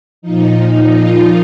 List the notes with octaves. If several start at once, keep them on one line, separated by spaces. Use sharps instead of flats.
A#2 F3 D#4
D#4
F4